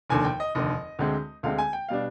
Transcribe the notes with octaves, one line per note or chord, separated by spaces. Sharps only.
F1 D#2 D3 G#5
G5
D#5
F1 D#2 D3 D#5
D2 D3 G#3 C4
D2 D3 G#3 C4 F5
G#5
G5
B2 G3 D4 F5